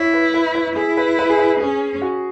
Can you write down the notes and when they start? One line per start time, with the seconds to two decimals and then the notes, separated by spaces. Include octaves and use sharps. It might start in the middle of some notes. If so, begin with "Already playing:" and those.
Already playing: E4 C#5
0.13 B4
0.34 B4
0.55 B4
0.76 E4 G#4
0.97 B4
1.19 B4
1.30 G#4
1.39 B4
1.60 C#4 G#4
2.01 F#4